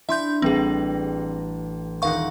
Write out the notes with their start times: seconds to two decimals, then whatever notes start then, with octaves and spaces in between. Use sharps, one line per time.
0.09 D4 E4 E5 C6 G6
0.42 A1 G3 C4 G#4
2.02 D#1 D#4 F5 F#5 C#6